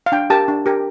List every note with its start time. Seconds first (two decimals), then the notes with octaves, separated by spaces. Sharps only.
0.06 F5
0.12 D4 G5
0.30 G4 A#4 A5
0.48 D4
0.66 G4 A#4